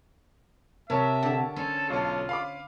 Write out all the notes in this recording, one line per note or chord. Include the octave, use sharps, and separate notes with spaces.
C3 A#4 C#5 E5 A5
D3
C#4 A4 C5
B1 F4 A4
F5 B5 D6